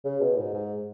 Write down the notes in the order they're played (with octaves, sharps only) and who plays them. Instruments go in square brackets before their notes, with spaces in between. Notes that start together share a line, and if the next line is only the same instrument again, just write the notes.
[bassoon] C#3
B2
G#2
G#2